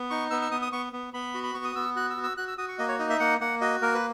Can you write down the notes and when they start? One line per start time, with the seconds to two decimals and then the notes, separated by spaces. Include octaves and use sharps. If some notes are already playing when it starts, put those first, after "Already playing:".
Already playing: B3
0.10 D#4 C#6
0.31 B3 E6
0.42 E6
0.51 B3 D#6
0.62 D#6
0.72 B3 C#6
0.93 B3
1.14 B3 B5
1.34 F#4
1.43 B5
1.54 B3 C#6
1.64 D#6
1.75 B3 E6
1.96 F#4 F#6
2.10 E6
2.17 F#4
2.24 E6
2.37 F#4 F#6
2.48 E6
2.58 F#4 D#6
2.68 C#6
2.79 A#3 D#5
2.88 C#5
2.99 D#4 D#5
3.10 E5
3.20 A#3 F#5
3.41 A#3 F#5
3.61 F#4 D#5
3.82 A#3 A#4
3.94 B4